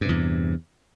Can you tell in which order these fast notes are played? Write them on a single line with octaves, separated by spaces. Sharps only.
G2 C3 E2